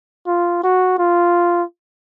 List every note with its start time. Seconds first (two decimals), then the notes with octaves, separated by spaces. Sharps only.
0.27 F4
0.63 F#4
0.98 F4